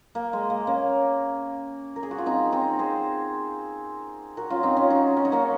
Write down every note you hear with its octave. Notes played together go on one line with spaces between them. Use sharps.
A#3
G#3
A#3
A#3 C#4
A#4
G#4
F#4
F4
C4 D#4
C4 D#4
G#4 C5
F#4 A#4
C#4 F4
C4 D#4
C#4 F4
D#4 F#4
C#4
D#4
A#3 C#4